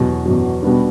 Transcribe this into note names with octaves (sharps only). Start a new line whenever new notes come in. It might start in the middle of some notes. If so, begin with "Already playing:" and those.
Already playing: E2 B2 F#3
E2 B2 F#3
B2 G3 B3 D4